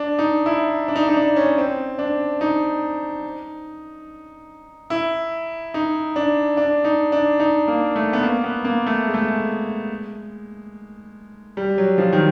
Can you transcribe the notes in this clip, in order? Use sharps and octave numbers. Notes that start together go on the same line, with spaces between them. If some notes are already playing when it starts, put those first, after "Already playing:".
Already playing: D4
D#4
E4
D4
D#4
D#4
D4
C#4
C4
D4
D#4
E4
D#4
D4
D4
D#4
D4
D#4
A#3
A3
B3
A#3
B3
A#3
A3
G#3
A3
G#3
G3
F#3
F3
D#3